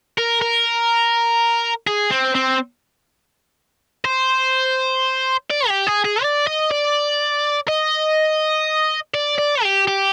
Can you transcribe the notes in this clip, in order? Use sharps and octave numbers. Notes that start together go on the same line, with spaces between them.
A#4
A#4
G#4
C4
C4
C5
D5
G4
G#4
G#4
D5
D#5
D5
D#5
D5
D5
G4
G4